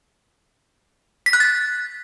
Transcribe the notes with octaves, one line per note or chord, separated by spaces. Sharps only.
B6
F#6
A6